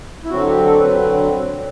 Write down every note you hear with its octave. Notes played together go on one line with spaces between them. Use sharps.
E4
D3 F#3 C4 F#4
G4
A4
D3 F#3 C4 B4